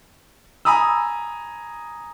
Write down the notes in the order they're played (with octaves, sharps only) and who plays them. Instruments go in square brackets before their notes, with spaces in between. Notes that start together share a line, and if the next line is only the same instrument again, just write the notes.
[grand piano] G#5 A#5 B5 D#6 E6